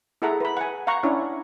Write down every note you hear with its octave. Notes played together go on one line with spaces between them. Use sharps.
E4 G#4 A4 E5 F#5 A#5
B4 B5
F#5 G#5
F5 F#5 A#5 C#6
C#4 D4 E4 C#5